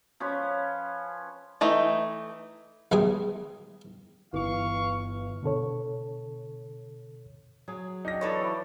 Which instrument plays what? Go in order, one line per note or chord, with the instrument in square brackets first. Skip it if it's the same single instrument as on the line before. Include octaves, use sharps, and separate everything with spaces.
[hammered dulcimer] F3 C#4 F4 B4
[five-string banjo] E3 A3 D#4
[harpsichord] B1 D#3 G3 G#3 G#4 D#6
[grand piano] G1 E3 [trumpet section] F5 C#6
[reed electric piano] B2 D3 A4 C#5
[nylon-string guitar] F#3 [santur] G#4
[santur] D4 F5 G5 [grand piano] D#4 A#6
[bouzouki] E3 A4 C#5 [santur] B3 D4 D5
[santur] E4